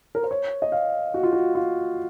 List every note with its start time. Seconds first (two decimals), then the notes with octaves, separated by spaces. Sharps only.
0.15 A#4
0.23 C5
0.31 C#5
0.62 D#5
0.72 F5
1.14 F#4
1.23 F4
1.33 F#4
1.55 F4